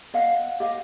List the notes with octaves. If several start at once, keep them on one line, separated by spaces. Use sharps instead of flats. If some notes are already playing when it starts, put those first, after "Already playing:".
D#5 F5 F#5
G4 D#5 F5